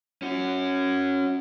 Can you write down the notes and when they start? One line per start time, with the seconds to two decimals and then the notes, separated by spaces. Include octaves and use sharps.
0.22 C#4 F#4